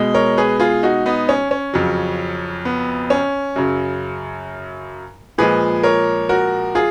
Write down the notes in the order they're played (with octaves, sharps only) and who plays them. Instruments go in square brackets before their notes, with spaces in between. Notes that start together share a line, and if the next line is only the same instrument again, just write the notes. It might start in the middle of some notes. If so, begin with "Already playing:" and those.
Already playing: [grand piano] B2 G#3
A#4 C#5
G#4 B4
F4 G#4
D#4 F#4
B3 D#4
C#4
C#4
F2 C#3 F#3
B3
C#4
F#2 C#3 F#3
A#2 F3 G#3 G#4 B4
A#4 C#5
F#4 A#4
F4 G#4